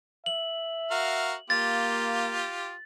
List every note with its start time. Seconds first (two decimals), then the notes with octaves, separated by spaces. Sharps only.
0.26 E5 F#7
0.91 F#4 A#4 F5
1.50 A#3 F4 G4 A6